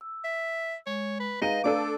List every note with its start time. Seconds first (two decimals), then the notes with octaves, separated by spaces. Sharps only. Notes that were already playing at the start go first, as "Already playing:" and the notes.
0.01 E6
0.24 E5
0.87 G#3 C#5
1.20 B4
1.42 G#3 D#4 B4 D#5 F5 A#5 D#7
1.64 A3 D4 A4 D6